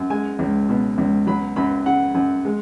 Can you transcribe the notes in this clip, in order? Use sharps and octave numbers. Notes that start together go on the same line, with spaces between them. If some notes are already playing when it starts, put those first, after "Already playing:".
Already playing: F#2
G#3 G#5
C#2
B2
C#2
F#3 B5
F#2 B5
C#3 F#5
F#2
G#3